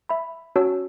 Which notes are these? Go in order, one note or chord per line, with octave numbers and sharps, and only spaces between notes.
E5 B5
C#4 F#4 C#5 A5 E6